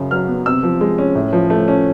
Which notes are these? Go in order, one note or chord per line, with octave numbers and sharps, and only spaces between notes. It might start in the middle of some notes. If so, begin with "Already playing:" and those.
Already playing: F#2 C#3
F#3 F6
B3
C3 E6
F3
G#3
C#4
A2
F3
A3
C#4